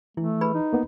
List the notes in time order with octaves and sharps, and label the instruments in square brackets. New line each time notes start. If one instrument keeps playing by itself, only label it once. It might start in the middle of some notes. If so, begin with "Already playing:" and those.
[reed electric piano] E3 [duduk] A3 [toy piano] E4
[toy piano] G#4 B4 B5
[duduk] D#4
[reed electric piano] A#3 B3